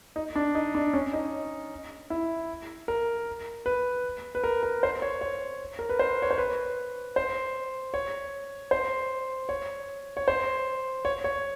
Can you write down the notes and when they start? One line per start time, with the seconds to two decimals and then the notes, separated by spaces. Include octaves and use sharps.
0.16 D#4
0.36 D4
0.55 D#4
0.75 D4
0.94 C#4
1.13 D#4
2.10 E4
2.88 A#4
3.66 B4
4.35 B4
4.44 A#4
4.63 A#4
4.83 C5
5.02 C#5
5.21 C#5
5.79 A#4
5.89 B4
5.99 C5
6.22 C#5
6.31 C5
6.38 B4
7.16 C5
7.94 C#5
8.71 C5
9.49 C#5
10.17 C#5
10.28 C5
11.05 C#5
11.24 C#5